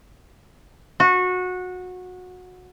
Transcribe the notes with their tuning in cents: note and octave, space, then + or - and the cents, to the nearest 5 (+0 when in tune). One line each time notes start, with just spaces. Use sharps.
F#4 -20